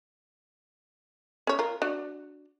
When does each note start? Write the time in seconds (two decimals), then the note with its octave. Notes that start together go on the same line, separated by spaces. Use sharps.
1.47 C#4 C#5
1.59 F4 A#4
1.82 D4 F#4